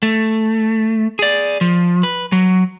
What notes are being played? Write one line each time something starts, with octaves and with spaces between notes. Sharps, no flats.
A3
G#4 D5
F3
B4
F#3